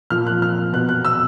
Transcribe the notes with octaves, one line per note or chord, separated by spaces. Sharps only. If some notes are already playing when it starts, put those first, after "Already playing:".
A#2 F3 F6
F#6
F6
B2 F#6
F#6
E6